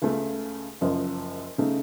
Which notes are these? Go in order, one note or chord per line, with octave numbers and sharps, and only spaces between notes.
C#2 C#3 A3
F#1 F#2 F3
C#3 A3 D#4